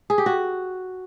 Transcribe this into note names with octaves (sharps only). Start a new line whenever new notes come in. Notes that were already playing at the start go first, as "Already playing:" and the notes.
G#4
G4
F#4